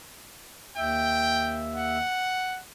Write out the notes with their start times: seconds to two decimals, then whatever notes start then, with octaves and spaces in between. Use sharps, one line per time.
0.77 D#2 E5 G5
1.75 F#5